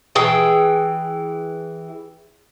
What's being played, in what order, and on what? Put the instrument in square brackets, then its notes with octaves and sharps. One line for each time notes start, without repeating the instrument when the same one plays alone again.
[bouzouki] E3 G#4 G5